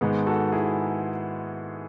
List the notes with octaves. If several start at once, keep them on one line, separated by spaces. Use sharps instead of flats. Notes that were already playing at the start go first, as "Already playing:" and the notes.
G#2 D#3 G#3 B3
F#4 A4
E4 G#4